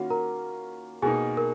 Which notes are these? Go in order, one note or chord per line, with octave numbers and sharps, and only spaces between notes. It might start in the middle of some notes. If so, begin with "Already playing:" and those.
Already playing: D#3 A#3 C#4 F4 F#4 F#5
A#4 A#5
B2 A#3 D#4 G#4 G#5
A#4